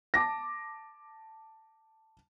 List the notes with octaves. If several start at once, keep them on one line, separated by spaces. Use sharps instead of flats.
A5 D6 A#6